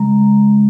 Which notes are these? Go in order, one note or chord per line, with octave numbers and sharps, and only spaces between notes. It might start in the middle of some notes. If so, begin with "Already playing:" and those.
Already playing: C#3 G#3 A#5